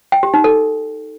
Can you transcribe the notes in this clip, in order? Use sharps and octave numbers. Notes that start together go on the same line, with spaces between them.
G5
G4
D#4
A4